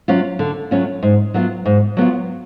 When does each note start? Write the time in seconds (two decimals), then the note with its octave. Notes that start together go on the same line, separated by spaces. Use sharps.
0.08 F#3 C#4 F4
0.39 D3
0.71 F#3 C#4 F4
1.03 G#2
1.34 F#3 B3 F4
1.65 G#2
1.97 F#3 B3 F4